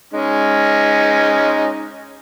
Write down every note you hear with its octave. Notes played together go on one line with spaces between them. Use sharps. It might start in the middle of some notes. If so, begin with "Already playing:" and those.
G#3 C#4 D#4